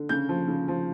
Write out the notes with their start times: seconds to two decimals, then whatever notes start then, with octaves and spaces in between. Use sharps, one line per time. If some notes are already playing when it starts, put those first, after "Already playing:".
Already playing: D3
0.09 C#3 G6
0.29 F3
0.48 C#3
0.68 F3